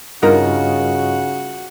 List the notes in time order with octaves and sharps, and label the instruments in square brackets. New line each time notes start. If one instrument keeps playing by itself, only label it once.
[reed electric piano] G2 F4 D#5 [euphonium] C#3 [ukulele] D#4 A#4 [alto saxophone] F#4